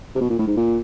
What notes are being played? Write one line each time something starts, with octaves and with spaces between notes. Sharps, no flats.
C3
B2
A#2
A2
G#2
A#2